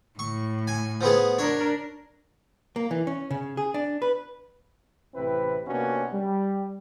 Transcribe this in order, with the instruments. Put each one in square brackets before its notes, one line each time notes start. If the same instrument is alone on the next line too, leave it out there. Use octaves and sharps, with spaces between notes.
[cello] A2 [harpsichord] C#6
[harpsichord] G#5
F3 B3 G#4
[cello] D4 A#4 [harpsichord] C#5
[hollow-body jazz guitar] A#3
E3
C#4
C#3
G#4
D4
B4
[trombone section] A1 C3 C4 E4 B4
C3 A#3 B3 C#4 D4 F#4
G3